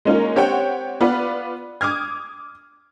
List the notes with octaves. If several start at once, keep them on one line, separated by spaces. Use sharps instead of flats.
G#3 A#3 C#4 D#4 F4 A#4
C4 G4 C#5 F#5 G5
B3 F4 B4 D5
D6 D#6 F6 G#6